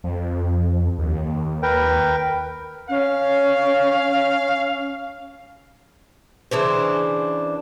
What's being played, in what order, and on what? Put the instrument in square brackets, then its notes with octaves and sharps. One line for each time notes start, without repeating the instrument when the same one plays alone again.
[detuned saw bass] F2
D#2
[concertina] A#4 B4 G5
[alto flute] C#4 [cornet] F5
[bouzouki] C#3 E3 D4 C5